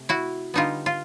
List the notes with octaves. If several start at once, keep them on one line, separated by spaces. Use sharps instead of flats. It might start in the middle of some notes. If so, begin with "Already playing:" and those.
Already playing: C3 A3
E4 F#4
D3 G3 B3 D#4 F4
F4